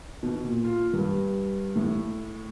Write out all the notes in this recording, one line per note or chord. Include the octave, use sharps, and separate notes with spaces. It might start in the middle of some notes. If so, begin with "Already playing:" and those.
B2
A#2
F4
G2
A2